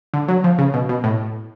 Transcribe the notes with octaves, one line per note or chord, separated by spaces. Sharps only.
D3
F#3
F3
C#3
B2
B2
A2